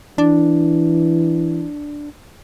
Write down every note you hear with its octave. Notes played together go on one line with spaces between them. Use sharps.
E3 D4